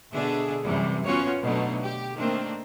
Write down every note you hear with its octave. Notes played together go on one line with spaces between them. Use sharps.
B2 D3 D4 G#4 E5
F#2 C3 E3 G3
B3 C#4 F4 F#4 C#5
B2 D3 F#3 A3 D#4
G4
D#3 A3 A#3 C4 D4